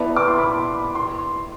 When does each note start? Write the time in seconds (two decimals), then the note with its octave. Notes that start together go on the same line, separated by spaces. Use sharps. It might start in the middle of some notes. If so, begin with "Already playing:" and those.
Already playing: B3 E4 B4 D5 A5
0.16 D6
0.27 C6
0.38 B5
0.95 C6